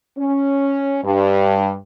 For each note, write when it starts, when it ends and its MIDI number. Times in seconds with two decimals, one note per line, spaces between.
0.18 0.98 61
1.05 1.73 43